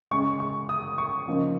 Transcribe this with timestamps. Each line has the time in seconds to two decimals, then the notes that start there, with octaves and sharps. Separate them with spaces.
0.11 C#3 G#3 C#4 C#6
0.40 C#6
0.69 D#6
0.98 C#6
1.28 C#3 F3 A#3 D#4